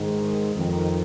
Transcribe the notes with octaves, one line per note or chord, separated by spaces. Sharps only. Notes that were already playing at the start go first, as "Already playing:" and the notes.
Already playing: G#2 D#3
F2 D#3